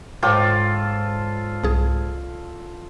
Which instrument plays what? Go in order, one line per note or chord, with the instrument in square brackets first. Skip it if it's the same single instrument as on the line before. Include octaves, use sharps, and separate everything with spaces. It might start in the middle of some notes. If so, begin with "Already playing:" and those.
[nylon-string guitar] G#2 C#5 G5 [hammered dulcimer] F4 A4 D5 [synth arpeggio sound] G6
[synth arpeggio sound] C2 G#4